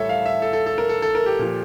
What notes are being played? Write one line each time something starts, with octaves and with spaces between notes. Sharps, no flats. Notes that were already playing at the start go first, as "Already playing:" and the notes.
Already playing: A2 E3 G3 A4 C#5 E5
F5
E5
A4
A4
A4
A#4
A4
A4
A#4
G4
A#2 F3